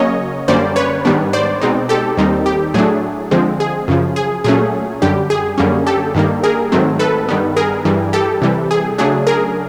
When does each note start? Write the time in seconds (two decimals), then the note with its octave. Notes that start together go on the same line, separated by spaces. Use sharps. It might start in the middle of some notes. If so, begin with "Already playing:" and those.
Already playing: C#3 F#3 A#3 C#4 C#5 D#5
0.48 F#2 D3 G3 A#3 C#4 C5 D5
0.76 B4 C#5
1.05 G#2 D#3 G3 B3 D4
1.33 C5 D5
1.61 B2 G#3 C4 D#4
1.89 G4 A4
2.17 D#2 D#3 G3 C4 D#4
2.46 G4
2.74 A2 F#3 A3 D4 G#4
3.31 D3 F3 G#3 C4
3.60 G#4
3.88 F#2 C#3 F3
4.16 G#4
4.44 A#2 F#3 A3 C#4 G#4
5.02 F#2 D3 G3 G4
5.30 G#4
5.58 F#2 D3 G3 A#3 C#4
5.87 G4 A4
6.15 G2 D#3 G3 A#3
6.43 G#4 A#4
6.72 G#2 D#3 F#3 A3 C4
6.99 A4 B4
7.29 G2 D#3 G3 B3
7.56 G#4 A#4
7.85 G2 E3 G3
8.13 G4 A4
8.42 C3 E3 G3
8.71 G#4
8.98 C#3 F#3 A3 D4 G#4
9.27 G#4 A#4